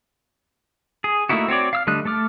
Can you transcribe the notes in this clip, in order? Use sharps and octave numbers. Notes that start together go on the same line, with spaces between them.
G#4
A3 A#3 D#4 E4 F#4
C4 F#4 C#5 D5
F5 E6 F6
D3 G3 A3 D#5 F#6
A3 A4 D6 F6